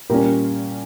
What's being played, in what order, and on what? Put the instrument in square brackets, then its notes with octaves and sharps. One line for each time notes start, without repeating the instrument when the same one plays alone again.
[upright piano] A#2 G3 C#4 G4 A#4